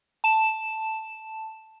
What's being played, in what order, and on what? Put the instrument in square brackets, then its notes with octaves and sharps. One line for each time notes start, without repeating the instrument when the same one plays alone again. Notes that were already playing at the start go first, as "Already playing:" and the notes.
[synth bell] A5 E7